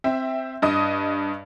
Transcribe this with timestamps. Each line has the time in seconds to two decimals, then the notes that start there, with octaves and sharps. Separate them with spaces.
0.04 C4 E5
0.62 G2 D#5 D#6